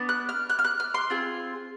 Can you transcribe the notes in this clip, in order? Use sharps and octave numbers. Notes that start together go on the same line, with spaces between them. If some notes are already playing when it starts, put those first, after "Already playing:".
Already playing: B3 D4
F#6
F6
F#6
F6
F#6
F6
C6
C4 F4 G#4